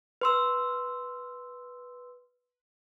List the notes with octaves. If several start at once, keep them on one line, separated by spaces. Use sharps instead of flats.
B4 C6 E6